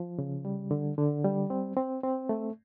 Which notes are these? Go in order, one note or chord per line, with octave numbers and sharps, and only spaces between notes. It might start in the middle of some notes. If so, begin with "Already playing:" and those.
Already playing: F3
C#3
G3
D3
D3
G3
C4
C4
C4
A3